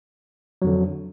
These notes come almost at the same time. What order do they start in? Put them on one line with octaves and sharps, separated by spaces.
F#3 F2 D3